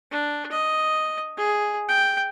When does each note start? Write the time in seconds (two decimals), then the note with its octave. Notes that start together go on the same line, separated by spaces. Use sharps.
0.11 D4
0.51 D#5
1.37 G#4
1.88 G5